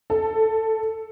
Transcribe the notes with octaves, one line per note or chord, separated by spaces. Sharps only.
A4